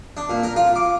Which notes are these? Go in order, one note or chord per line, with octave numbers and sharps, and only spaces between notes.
D4
A#2
A#4
F4
D6